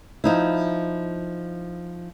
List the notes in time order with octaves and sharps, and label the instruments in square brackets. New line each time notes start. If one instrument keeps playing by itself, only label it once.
[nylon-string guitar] F3 D#4 E4